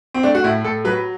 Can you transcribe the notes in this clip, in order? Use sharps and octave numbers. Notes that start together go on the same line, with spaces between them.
C4
A3 D4
F#4
A2 E4
A2 A4
F#3 B4